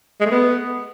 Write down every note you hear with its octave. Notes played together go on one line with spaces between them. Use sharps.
G#3
A3
B3